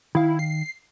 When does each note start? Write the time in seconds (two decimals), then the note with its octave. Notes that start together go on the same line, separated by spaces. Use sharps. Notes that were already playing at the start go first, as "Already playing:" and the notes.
0.15 D#3 E4 F5
0.39 C7